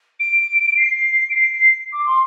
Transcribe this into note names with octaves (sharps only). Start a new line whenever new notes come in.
D7
C7
D7
C7
C7
D6
C6